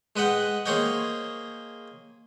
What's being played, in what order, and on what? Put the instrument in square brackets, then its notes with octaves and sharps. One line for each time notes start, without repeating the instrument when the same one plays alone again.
[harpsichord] G#3 B4 D#5 F#5 G5
A#3 G#4 C5 C#5 D#5 G5